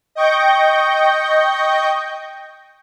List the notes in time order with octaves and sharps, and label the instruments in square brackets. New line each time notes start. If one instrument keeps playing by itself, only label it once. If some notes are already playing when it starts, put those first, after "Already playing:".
[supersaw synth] D#5 G5 C#6 G6 A#6